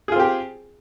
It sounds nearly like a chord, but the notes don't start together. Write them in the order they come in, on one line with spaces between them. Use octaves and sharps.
G#4 F4 C4 G4